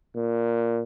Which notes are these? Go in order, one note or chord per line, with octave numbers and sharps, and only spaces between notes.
A#2